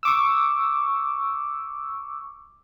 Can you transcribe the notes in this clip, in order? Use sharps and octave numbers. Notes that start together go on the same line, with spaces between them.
C#6 D6 E6